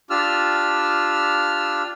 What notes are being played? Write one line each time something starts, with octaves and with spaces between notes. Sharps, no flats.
D4 F4 G4 E6 F6